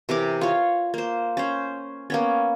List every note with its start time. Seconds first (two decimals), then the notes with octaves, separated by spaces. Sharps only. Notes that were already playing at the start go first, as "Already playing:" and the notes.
0.09 C3 E3 A#4 D6
0.41 F4 C#5
0.94 A#3 C5
1.37 C#4 C5
2.10 A#3 B3 C#4